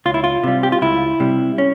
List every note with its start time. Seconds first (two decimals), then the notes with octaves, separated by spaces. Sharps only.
0.05 C#2 F4
0.14 E4
0.24 F4
0.43 C3 G3
0.63 G4
0.72 F4
0.82 C#2 E4
1.20 C3 G3
1.58 C#4